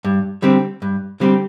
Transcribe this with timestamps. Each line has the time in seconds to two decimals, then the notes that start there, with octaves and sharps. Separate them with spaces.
0.05 G2
0.42 D3 G3 C4 G4
0.82 G2
1.20 D3 G3 C4 G4